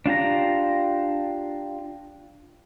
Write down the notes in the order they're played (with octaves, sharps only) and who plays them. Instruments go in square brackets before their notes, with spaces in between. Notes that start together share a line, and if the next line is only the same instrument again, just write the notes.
[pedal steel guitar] D4 F4 G4 A#5